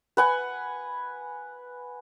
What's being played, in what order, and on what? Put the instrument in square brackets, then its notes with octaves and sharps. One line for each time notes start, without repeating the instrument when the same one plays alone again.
[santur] B4 F#5 G#5